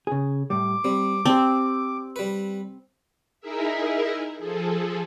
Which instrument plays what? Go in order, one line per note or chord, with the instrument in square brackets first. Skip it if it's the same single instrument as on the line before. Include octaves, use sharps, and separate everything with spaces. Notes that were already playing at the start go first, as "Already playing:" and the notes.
[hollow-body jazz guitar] C#3 G#4
[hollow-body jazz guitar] A2 G3 [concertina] D6
[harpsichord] G3 [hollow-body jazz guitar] C4
[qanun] C4 [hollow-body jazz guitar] G4 A5 [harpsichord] D5
[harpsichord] G3 B4
[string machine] D#4 E4 G#4 A#4 E5
F3 G#4 A4